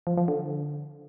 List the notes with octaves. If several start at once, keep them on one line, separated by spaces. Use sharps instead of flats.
F3
F3
D3